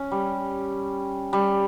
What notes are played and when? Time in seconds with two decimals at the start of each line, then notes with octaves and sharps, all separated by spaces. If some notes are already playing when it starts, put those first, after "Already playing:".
Already playing: C#4
0.12 G3
1.33 G3